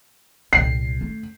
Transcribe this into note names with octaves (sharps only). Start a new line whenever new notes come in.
C2 A#2 C7
A3